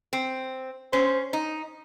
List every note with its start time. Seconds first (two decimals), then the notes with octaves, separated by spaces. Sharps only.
0.13 C4
0.93 C#4 C5
1.33 D#4